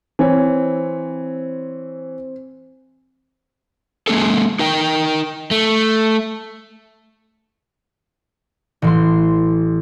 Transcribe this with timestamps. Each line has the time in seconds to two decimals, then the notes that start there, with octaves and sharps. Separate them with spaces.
0.19 E3 C4 C#5
4.07 G#3 A#3 C#4 G#4 A4
4.59 D#4 A#4 G5
5.51 A3
8.82 A1 E3 C6